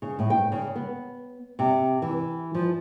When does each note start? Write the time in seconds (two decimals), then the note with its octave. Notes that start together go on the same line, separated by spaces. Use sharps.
0.02 C#3
0.19 A2
0.30 G5
0.52 C#3
0.75 B3
1.59 C3
2.02 E3
2.55 F3